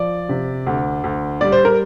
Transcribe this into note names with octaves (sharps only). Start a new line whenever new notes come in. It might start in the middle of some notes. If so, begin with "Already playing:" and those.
Already playing: F3 D5
C3
D2
D2
G3 D5
C5
A#4